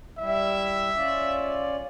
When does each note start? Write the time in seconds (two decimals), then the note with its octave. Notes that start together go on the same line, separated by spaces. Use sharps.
0.19 G3 E4 E5
0.95 C#4 F4 D5